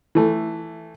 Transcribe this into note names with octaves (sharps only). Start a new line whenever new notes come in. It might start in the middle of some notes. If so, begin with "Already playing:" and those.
E3 A3